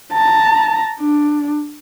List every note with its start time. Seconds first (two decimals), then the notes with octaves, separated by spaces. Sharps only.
0.13 A5 A#5
1.00 D4